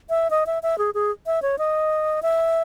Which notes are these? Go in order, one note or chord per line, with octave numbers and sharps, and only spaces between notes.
E5
D#5
E5
E5
G#4
G#4
E5
C#5
D#5
E5